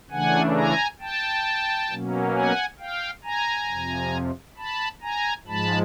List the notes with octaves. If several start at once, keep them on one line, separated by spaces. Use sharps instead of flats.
C#3 E3 A3 D4 F#5 G#5
G#5 A#5
G5 A5
B2 F#3 A#3 C#4
F#5 G#5
F5 G5
G#5 A#5
F2 C3 F3
A5 B5
G#5 A#5
G#2 F3 G#3 A5 B5